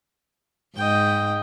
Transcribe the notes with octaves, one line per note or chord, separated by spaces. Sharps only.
G#2 D#5 G5